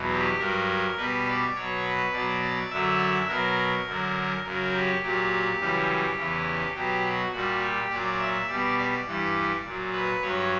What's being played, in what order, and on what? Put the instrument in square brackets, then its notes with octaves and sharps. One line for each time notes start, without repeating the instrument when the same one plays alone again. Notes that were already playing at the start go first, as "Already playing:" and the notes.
Already playing: [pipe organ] E2 B2 F#3
G4
G2 F#3 A#4
B2 G3 B4
D5
B2 F#3 C#5
B4
B2 F#3 D5
D5
F#2 D3 F#3 E5
B2 F#3 A#4
F#2 D3 F#3
F#2 C#3 F#3 A#4
G4
A#2 F#3 G4
F#2 C#3 E3 G3
E2 C#3 E3
B2 F#3 G4
F#4
A#2 G3 F#4
G4
A#2 F#3 D5
E5
B2 G3 D5
D5
G2 E3 G3
A#2 F#3
B4
G2 F#3 C#5